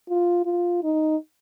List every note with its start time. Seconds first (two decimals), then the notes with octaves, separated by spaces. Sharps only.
0.09 F4
0.45 F4
0.83 D#4